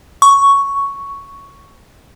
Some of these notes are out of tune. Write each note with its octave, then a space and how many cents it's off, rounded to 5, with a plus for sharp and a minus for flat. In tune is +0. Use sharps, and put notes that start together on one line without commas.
C#6 +5